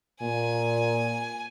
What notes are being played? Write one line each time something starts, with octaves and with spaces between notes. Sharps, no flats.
A#2 G#5